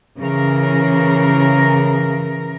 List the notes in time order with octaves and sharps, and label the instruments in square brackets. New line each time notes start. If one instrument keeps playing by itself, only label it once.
[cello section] C#3 E3 A#4